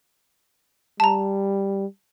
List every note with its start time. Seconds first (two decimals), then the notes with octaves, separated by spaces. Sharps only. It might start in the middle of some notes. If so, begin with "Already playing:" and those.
1.00 G3 A5 A#5